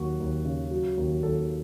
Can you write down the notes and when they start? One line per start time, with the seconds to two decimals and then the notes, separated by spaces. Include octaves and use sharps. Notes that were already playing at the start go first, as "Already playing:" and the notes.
Already playing: D#2 F#3 F#4
0.20 D#2
0.45 C#3
0.71 F#3
0.97 D#2
1.23 D#2 A4